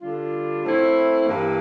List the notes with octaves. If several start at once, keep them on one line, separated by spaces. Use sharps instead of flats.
D3 G3 D4 F4
A3 C4 E4
G2 E3 A#3